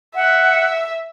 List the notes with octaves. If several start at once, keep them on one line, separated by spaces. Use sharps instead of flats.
E5 F#5